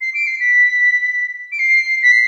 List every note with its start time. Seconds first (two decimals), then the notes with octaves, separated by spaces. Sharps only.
0.01 C7
0.14 D7
0.27 C7
0.40 B6
1.52 D7
1.59 C7
2.02 B6
2.12 C7